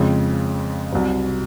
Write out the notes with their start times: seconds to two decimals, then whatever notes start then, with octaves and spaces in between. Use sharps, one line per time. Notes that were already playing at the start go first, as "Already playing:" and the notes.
Already playing: F2 C#3 G#3 C4
0.92 C2 C3 F#3